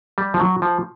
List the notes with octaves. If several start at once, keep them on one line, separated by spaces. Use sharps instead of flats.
G3
F3
F#3
F3